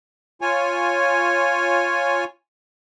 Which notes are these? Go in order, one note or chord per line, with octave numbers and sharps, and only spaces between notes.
F4 C#5 G#5